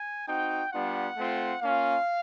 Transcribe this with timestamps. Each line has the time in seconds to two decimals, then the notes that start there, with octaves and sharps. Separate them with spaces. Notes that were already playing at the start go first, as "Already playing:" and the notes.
Already playing: G#5
0.27 C4 D#4 F#4 G5
0.72 G3 B3 D4 F4 F#5
1.17 A3 C4 F4
1.62 A#3 C#4 F4 F5